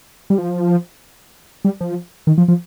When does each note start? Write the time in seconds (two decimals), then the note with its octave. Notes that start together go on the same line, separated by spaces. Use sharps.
0.30 G3
0.38 F3
1.65 G3
1.81 F3
2.27 D#3
2.38 F3
2.48 F3